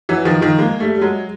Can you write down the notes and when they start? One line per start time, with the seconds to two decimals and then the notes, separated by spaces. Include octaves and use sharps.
0.09 E3 F#3
0.25 D#3 F3
0.41 D#3 F3
0.59 G#3 A#3
0.80 G3 A3
0.95 G3
1.01 F#3 G#3